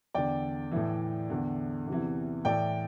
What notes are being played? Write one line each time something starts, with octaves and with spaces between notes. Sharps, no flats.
E2 D3 D5 G5
A2 E3
E2 D3
E2 C3 E3
A2 E3 D5 G5